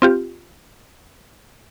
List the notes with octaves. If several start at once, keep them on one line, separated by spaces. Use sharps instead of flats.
C4 F4 G4